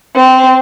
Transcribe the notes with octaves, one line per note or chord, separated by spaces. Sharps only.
C4